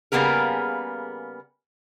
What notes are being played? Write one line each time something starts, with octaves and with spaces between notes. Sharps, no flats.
C#3 G3 A#3 B3 G#4 A#4